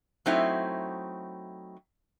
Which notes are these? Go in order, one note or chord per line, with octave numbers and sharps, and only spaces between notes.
F#3 A3 C4 D#4 E4